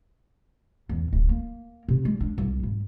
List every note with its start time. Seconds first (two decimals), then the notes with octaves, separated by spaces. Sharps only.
0.89 E2
1.13 D1
1.29 A#3
1.88 C3
2.05 G#3
2.20 D4
2.38 C2
2.63 G#1